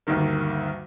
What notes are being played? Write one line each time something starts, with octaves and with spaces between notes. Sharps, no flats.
D2 G2 D#3 A#3